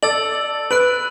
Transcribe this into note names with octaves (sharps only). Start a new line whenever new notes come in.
A4 D5 E6 A6 F#7
B4 F#6 D7 F#7